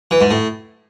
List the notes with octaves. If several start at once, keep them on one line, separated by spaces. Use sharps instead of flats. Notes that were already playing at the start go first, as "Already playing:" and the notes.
E3
G#2
A2